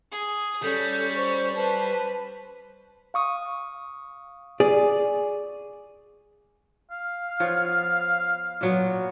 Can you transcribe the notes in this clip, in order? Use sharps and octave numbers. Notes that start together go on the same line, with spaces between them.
G#4
G3 C#4 A4 G6
C5 C#6
B4 C5 A5
F5 C#6 D#6
G#4 D5
F5
F3 B3 C#5
A#2 F#3 B3